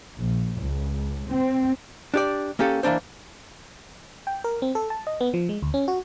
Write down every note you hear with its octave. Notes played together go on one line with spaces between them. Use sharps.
A#1
C#2
C4
D4 G4 D5
A#3 C#4 G4 A4
E3 A#3 D4 C5
G5
A#4
C4
A4
A5
D#5
B3
F3
G#3
D2
C#4
F#4